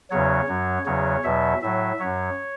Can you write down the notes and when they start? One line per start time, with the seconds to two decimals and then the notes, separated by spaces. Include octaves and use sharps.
0.10 E2 C#3 F#3 C#5
0.48 F#2 F#3
0.86 E2 C#3 F#3 C#5
1.24 E2 B2 F#3 E5
1.62 A2 F#3 E5
1.99 F#2 F#3 C#5